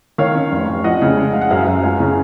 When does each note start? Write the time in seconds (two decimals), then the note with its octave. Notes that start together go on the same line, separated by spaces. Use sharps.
0.18 D#3 C#5 F5
0.35 C#4
0.52 F1
0.68 F1
0.84 F2 D#5 F#5
1.02 C#3
1.17 G#3
1.33 G#3 F5
1.42 F#5
1.51 F#2 F5 G#5
1.67 F#2
1.83 C#2 F5 G#5
2.00 C#3